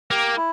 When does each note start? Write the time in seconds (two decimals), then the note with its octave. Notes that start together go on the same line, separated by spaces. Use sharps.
0.11 A#3 G4
0.37 E4